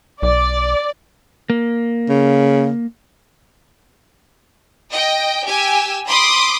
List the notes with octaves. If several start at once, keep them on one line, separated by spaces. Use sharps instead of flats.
B1 D5
A#3
C#3
D#5 G5
G4 G#5 E6
B5 C6 D6 D#6